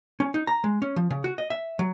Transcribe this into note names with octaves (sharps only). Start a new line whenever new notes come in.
C#4
D#4
A#5
G#3
C#4
F3
C#3
F#4
D#5
E5
F#3